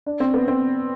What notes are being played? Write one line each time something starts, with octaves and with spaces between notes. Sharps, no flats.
D4
C4
B3
C4